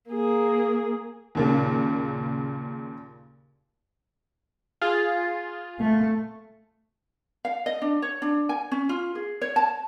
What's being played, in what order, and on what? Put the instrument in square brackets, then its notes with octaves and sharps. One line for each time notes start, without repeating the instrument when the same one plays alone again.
[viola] A#3 G#4
[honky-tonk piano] D#2 A#2 C#3
[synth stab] F4 G#4
[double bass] A3
[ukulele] F5
D#5
D4
C#5
D4
G#5
C#4
F4
G#4
C#5
A5